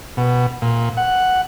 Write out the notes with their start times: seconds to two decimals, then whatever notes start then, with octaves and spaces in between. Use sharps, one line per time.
0.17 B2
0.62 A#2
0.97 F#5